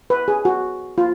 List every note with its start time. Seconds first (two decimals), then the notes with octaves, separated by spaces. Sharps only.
0.10 B4
0.28 G#4
0.45 F#4
0.98 F4